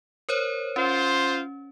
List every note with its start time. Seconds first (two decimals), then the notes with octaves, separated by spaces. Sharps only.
0.29 A#4 C5 C#5
0.76 C#4 F4 C5